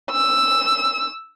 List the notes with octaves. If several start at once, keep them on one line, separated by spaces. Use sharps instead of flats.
E6